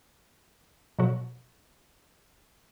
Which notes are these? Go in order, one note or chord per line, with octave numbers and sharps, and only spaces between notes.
B2 F3 F#3 F#4 A4